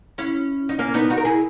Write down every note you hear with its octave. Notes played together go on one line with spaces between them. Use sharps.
C#4 E4
D#4
A#3 C#4
B3 D#4
D#4 F#4
A#4
E4 G#4